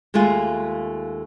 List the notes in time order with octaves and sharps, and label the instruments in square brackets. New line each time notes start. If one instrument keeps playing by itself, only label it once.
[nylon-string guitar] D#2 G#3 A3 F4 G#5